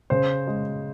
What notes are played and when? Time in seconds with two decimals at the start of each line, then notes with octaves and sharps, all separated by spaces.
0.10 C#3 C5
0.47 G#3